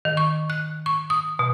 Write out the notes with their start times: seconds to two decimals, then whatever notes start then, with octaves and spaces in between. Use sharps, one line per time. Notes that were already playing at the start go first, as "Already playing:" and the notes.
0.05 D#3
0.17 C#6
0.50 F#6
0.86 C#6
1.10 D#6
1.39 B2